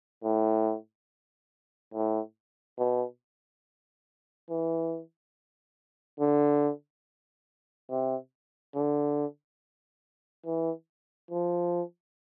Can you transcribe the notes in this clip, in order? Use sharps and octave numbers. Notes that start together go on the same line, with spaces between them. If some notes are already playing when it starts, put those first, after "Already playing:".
A2
A2
B2
E3
D3
C3
D3
E3
F3